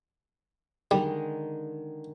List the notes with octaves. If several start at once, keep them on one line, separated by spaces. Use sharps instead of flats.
D3 D#3 G3 G#3